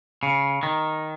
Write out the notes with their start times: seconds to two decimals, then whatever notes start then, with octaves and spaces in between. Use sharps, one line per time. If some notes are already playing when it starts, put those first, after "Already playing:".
0.23 C#3
0.63 D#3